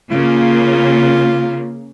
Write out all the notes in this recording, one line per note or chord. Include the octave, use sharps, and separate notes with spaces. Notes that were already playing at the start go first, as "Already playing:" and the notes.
C#3 A#3 F4